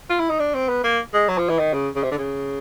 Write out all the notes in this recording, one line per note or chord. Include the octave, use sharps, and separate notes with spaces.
F4
E4
D#4
D4
C4
B3
A#3
G#3
F#3
F3
E3
D#3
C#3
C#3
C3
D3
C#3